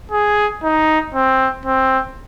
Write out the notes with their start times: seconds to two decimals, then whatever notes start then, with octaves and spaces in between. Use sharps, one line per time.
0.12 G#4
0.63 D#4
1.15 C4
1.66 C4